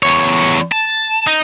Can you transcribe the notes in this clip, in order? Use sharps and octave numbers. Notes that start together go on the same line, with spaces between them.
E2 C#5
A5
D#4